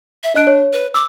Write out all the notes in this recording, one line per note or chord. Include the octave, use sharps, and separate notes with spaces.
E5
D4 D#5 F#6 D7
C#5
B4
D6 E6